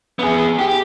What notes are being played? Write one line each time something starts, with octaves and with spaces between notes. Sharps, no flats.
B3 G#4
G4